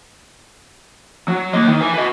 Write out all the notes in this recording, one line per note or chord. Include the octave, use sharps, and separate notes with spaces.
F#3
A#3 D#5
D#3
B4 G#5
B4 D#5